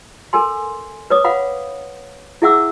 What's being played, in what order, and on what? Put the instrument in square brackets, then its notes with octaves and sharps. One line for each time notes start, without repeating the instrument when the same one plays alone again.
[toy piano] A4 A#4 G#5 C6
B4 C#5 D6 D#6
B4 F5 F#5 B5
E4 G#4 E5 F#5 D6 E6